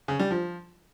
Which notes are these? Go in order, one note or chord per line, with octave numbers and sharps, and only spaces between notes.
C#3
G3
F3